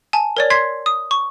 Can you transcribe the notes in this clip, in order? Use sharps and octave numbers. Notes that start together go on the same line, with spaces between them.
G#5 A5
A#4 C#5 D5
C6 G#6 B6 C7
D#6
C#6